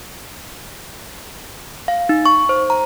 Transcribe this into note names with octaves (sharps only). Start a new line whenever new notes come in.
F5
D#4
C#6
C5
A#5